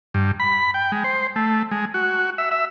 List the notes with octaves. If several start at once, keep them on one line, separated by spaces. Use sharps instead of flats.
G2
B5
G5
G#3
C5
A3
G#3
F#4
E5
E5